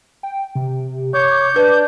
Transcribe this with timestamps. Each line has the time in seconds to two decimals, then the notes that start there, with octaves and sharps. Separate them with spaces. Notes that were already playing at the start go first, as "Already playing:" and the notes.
0.23 G5
0.55 C3
1.14 C#5 D6 G6
1.56 D4 B4